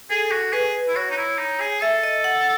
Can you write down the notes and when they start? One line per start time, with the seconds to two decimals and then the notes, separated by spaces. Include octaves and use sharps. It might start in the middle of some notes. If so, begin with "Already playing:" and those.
0.10 G#4 A4
0.32 F#4
0.53 G#4 B4
0.88 E4
0.96 F#4 C#5
1.11 D#4
1.17 E4
1.38 D#4
1.60 G#4
1.82 A4 E5
2.03 D#5
2.24 F#5